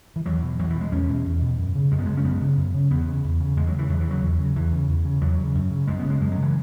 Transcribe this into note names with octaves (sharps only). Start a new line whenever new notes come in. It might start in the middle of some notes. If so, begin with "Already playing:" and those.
E3
E2 F#3
B2
E2 F#3
E3
B2
G#3
E2 C#4
B2
E2
B2
F#2
C#3
F#2 G#3
B3
C#3 G#3
C#4
F#2 B3
C#3
F#2
C#3
E2 B3
C#3
E2
C#3
E2 G#3
F#3
C#3
E3
E2 F#3
E3
C#3 F#3
E2
C#3
E2 E3
C#3
E2
C#3
E2 F#3
C#3
F#2
C#3
F#2 G#3
B3
C#3
G#3
F#2 G#3
F#3
C#3
E3